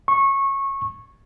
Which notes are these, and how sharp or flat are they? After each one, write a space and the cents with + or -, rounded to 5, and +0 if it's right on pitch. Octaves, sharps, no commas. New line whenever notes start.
C#6 -20